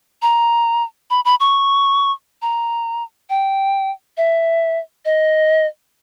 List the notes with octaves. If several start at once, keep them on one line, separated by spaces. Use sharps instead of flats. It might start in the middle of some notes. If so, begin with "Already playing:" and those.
A#5
B5
B5
C#6
A#5
G5
E5
D#5